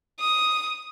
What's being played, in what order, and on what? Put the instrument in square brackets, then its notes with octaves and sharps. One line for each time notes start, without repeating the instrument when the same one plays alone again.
[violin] D#6